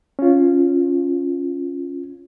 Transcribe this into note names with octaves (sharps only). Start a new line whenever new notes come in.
C#4 F4